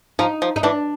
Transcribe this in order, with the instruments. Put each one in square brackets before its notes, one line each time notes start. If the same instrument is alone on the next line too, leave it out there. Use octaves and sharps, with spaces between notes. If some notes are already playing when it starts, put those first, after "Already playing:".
[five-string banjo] F3 [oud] D#4
[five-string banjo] F3
[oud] D#4
[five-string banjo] E3 [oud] D4